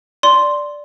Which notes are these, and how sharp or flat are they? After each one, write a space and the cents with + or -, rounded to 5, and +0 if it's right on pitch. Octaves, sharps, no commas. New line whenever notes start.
D5 +0 C6 +0